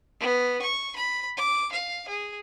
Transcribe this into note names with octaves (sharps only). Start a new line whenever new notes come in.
B3
C#6
B5
D6
F5
G#4